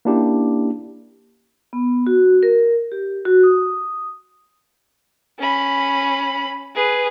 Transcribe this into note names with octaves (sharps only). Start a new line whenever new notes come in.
A#3 C#4 D4 E4 G4
B3
F#4
A#4
G4
F#4
D#6
C#4 B5
G#4 B4